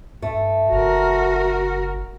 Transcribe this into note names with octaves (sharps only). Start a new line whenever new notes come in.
G2 A3
F#1 F#4 A#4